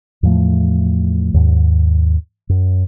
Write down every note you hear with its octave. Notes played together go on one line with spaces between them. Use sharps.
E2 A2 F3 A3
D#2 G#2
F#2